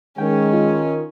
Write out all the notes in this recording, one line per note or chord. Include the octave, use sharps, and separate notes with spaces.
D#3 G#3 C#4 G5
F4